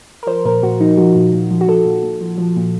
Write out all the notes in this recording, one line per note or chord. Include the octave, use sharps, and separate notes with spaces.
A#4
F3 C5
A#2 A#4
A#2 F#4
F3 D#4
F3 F#4
A#2
A#2
F3
F#4
F3 A4
A#2
A#2
F3
F3
A#2